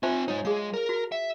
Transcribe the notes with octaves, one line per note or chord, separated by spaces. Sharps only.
C4 F4 C5 E5 G#5
G#3 D#4 C#5
G#3 G#4 F5
A#4
F#4
E5